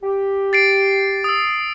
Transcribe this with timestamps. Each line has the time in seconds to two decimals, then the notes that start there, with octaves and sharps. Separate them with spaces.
0.02 G4
0.53 A6 C7 D7
1.24 D#6 E6